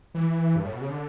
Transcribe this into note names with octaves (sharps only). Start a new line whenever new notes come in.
E3
G2
A2
B2
C#3
D3